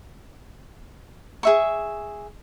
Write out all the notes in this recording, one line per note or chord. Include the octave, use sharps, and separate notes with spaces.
G#4 E5 C#6